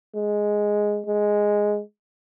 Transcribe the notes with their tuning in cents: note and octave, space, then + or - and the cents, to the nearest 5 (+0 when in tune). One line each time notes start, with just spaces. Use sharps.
G#3 +0
G#3 +0